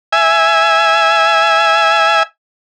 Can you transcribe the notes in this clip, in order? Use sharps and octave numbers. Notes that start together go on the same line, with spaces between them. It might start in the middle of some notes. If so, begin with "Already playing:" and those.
E5 G#5